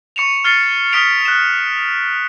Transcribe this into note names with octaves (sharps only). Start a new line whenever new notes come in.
C#6 C#7 E7 F7
F6 A6 C7 C#7
D#6 F6 B6 C#7 D7 F7
F#6 E7